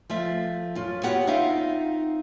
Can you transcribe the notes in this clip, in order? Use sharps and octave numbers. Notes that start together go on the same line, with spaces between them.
F3 A3 E5
F#2 F4
B3 C4 F#4 G4 C#5 F#5
C4 D#4 F4 E5 F5